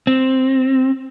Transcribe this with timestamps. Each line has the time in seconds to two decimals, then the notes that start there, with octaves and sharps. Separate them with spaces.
0.07 C4